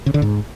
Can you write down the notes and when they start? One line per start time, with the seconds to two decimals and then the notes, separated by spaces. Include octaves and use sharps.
0.06 C#3
0.14 D3
0.22 G#2